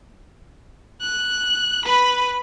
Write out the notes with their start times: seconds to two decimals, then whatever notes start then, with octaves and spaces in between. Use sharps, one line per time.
1.01 F#6
1.85 B4 B5